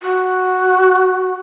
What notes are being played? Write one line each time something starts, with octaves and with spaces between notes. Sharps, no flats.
F#4